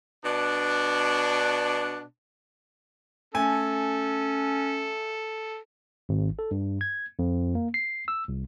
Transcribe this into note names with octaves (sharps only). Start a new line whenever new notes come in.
B2 D4
A3 C#4 A4 G#5
G#1
A4
G2
G#6
F2
A#3
C7
E6
C2